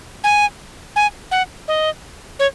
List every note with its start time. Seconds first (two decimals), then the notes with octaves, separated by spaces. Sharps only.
0.24 G#5
0.96 G#5
1.31 F#5
1.68 D#5
2.39 C#5